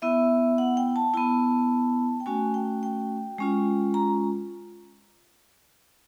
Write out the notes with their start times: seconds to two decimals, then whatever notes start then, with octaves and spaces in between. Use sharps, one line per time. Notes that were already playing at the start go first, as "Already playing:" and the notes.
0.02 B3 E4 E5
0.58 F#5
0.77 G5
0.96 A5
1.14 B3 E4 A5
2.20 G5
2.26 A3 C#4 F#4 G#5
2.54 G5
2.83 G5
3.38 G#3 C#4 F4
3.94 A#5